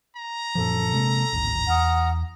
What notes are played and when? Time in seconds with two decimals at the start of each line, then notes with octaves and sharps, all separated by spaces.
0.17 A#5
0.55 F#2 A#2 F3 A4
0.93 C3 G#3 A#3
1.33 D1 G#1
1.68 E2 F#5 D#6 F6